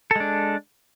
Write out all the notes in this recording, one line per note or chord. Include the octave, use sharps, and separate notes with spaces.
G#3 D4 A4